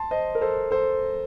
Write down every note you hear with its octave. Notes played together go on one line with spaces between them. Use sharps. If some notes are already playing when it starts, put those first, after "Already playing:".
Already playing: A5 C6
C5 D#5
A#4
A4 C5
A4 C5